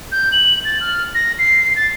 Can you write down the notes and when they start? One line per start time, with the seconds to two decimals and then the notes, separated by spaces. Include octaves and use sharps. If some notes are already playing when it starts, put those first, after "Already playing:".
0.12 G6
0.32 F#7
0.65 A6
0.81 F6
1.15 A#6
1.39 C7
1.76 A6